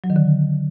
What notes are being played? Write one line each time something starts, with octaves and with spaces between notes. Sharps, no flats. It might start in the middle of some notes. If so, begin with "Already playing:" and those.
F#3
D#3
D3